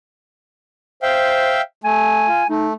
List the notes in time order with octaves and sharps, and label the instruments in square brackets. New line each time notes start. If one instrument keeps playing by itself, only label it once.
[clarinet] C5 [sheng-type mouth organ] E5 F5 G5
[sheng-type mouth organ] A3 [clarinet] G#5
[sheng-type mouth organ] F4
[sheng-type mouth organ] A3 [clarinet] D#4